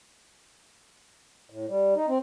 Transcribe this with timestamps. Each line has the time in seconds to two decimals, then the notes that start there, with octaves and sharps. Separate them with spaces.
1.50 A2
1.69 G3
1.96 D#4
2.08 C4